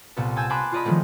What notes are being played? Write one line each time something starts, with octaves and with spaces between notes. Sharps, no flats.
C2 A#2 B3 A4
G#5 A5 E6 G6 G#6
G#5 A5 B5 C6 D6 F#6
F4 G#4 D5 D#5 B5
D#3 F3 F#3 G#3 A3 C4